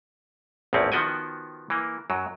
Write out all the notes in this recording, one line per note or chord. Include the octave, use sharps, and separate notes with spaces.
A#1 E2 A2 C4 C#4
D#3 F3 B3 F#4 G5 G#5
E3 A#3
F#2 F#3